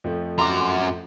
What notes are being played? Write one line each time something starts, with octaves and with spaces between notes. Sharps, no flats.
F2 F3 A3
F#2 A#5 C6 D6